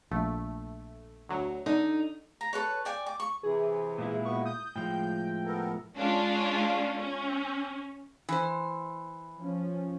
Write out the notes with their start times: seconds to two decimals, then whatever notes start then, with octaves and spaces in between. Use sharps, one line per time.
0.11 A#1 A3
1.29 D2 F#3
1.66 D3 D#4
2.41 A#5
2.53 A4 B4 C#5
2.85 D5 G5 G#5
3.06 D6
3.20 C#6
3.43 C3 E3 G#4
3.98 A#2 G#3 E4
4.25 B2 B3 C#6
4.45 D#6 G6
4.76 A2 F3 G#3 G5
5.46 B3 A4 A#4
5.96 G#3 C#4 D4 F4
6.98 C#4
8.29 E3 C5
9.39 F3 C#4